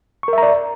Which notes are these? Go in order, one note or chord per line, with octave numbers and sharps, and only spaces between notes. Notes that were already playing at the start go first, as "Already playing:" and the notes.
A#4 D5 E5 A#5 C#6